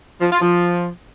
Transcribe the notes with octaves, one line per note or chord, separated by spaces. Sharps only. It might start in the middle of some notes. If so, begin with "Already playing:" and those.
F3
F4
F3